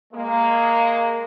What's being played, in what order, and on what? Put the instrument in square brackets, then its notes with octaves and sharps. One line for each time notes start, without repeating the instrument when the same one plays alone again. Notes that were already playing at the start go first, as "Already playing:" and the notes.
[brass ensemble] G#3 A#3